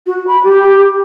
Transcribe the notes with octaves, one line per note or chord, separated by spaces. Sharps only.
F#4
B5
G4